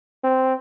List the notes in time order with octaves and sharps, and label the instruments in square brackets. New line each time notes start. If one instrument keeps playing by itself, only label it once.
[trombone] C4